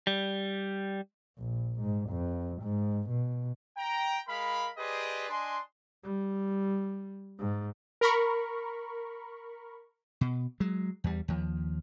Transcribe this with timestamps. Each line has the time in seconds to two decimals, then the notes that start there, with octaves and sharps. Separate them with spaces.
0.07 G3
1.38 A#1
1.80 G#2
2.09 F2
2.62 G#2
3.09 B2
3.77 G5 A#5
4.27 G#3 A#4 F5 B5
4.78 G4 G#4 B4 C5 D5 D#5
5.29 D4 D#5 G#5 C6
6.03 G3
7.39 G#2
8.01 A#4 B5 C#6
10.21 B2
10.60 F#3 G#3
11.04 E2 G3
11.28 D#2 F3